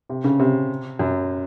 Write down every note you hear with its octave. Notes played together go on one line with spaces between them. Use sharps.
C3
C#3
C3
F#2